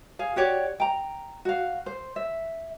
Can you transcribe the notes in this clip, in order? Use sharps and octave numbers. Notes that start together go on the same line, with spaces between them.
G#4 F5
F#4 G4 C#5 D5
G5 A#5
F#4 F5
C5
E5